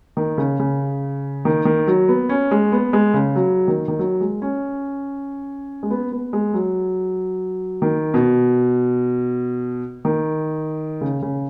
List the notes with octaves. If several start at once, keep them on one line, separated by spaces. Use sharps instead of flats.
D#3
C#3
C#3
D#3
D#3
F#3
B3
C#4
G#3
B3
G#3
C#3
F#3
D#3
D#3
F#3
G#3
C#4
G#3
B3
B3
G#3
F#3
D#3
B2
D#3
C#3
C#3